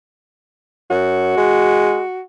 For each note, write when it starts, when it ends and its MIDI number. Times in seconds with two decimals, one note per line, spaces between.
0.90 1.34 42
0.90 2.21 66
1.37 2.02 56